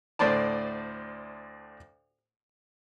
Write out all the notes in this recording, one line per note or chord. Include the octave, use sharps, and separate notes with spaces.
D2 A2 C5 D5 A5